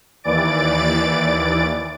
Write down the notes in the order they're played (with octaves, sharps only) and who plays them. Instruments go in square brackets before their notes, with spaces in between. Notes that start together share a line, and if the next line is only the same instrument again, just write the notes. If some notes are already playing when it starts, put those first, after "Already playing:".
[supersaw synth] D#2 E3 D5 A6 D7